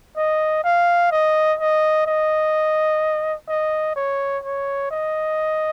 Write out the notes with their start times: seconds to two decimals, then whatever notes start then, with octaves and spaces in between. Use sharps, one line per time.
0.17 D#5
0.64 F5
1.11 D#5
1.59 D#5
2.06 D#5
3.49 D#5
3.96 C#5
4.44 C#5
4.91 D#5